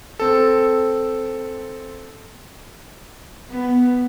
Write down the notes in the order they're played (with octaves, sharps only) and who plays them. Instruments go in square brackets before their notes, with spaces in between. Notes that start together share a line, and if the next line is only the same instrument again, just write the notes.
[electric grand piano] C4 A4
[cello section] B3